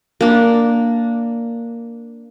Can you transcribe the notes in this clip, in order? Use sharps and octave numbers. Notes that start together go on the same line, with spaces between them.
A#3 D4